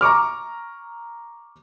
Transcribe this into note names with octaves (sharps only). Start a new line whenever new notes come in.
A#5 C#6 D6 F6